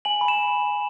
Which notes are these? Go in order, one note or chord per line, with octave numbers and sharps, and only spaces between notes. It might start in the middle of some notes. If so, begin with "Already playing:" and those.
G#5 F#7
B5
E7